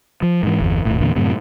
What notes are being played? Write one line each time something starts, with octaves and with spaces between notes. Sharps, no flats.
F3
G#2 E3
G1 E2
D#1 G#1 A2
E2 A#2 D3
F#2 A2 C3